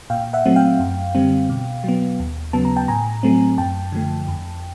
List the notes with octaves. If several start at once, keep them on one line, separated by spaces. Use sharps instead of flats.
A#2 F5 G5
E5 F#5
F#3 A3 C4
F5 G5
F#2
D3 G3 C4
B2
F#3 B3
D#2
C#3 F#3 B3 A5
A#5
G5 A5
A2 G#5 A#5
F#3 A3 C4
F#2 G5 A5
D3 F3 A3
F2